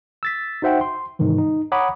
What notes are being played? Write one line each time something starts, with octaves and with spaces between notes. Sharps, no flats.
E6 A6 B6
D#4 F#4 C5 E5 F#5 G5
C6
G#2 C3 D#3 E3
D#4
C#5 F#5 A#5 B5 D6 D#6